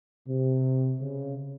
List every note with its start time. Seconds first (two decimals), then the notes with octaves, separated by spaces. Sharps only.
0.28 C3
1.01 C#3